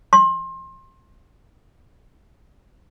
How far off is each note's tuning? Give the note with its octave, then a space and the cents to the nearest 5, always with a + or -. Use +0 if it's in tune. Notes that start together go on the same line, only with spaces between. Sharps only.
C6 +30